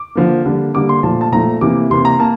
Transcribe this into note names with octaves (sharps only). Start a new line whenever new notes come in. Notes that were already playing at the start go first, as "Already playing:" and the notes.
Already playing: D6
D3 F3 A#3
D3 G3 A#3
D3 G3 A#3 D6
C6
A#2 F3 A3 A5
A5
A#2 F3 A3 A#5
C3 E3 A#3 D6
C3 E3 A#3 C6
A#5
A#3 A5